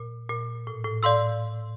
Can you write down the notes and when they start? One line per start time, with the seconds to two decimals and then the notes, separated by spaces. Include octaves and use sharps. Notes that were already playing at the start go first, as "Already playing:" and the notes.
Already playing: A#2
0.30 A#2
0.67 A2
0.84 A2
1.03 A2 D5 F5 C6 E6